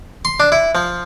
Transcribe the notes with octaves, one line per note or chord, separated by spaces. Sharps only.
C6
D4
E4
F3